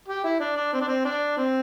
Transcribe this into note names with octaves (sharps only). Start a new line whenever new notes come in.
G4
E4
D4
D4
C4
D4
C4
D4
C4